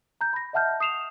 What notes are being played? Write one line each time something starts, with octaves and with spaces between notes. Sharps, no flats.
A#5 G6
B5 A#6
D#5 E5 F#5 A5 F6 G6
D#6 C7 E7 F7